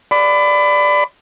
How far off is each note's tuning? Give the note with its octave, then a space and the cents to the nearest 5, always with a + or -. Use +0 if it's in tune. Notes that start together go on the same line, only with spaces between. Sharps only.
D5 +0 B5 +30